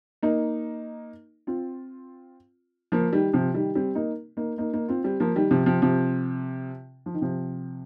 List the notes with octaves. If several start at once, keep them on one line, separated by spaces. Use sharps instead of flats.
A#3 D#4
C4 F4
F3 A#3
D#3 G3
C3 F3
D#3 G3
G3 C4
A#3 D#4
A#3 D#4
A#3 D#4
A#3 D#4
C4 F4
G3 C4
F3 A#3
D#3 G3
C3 F3
C3 F3
C3 F3
F3
D#3
C3 F3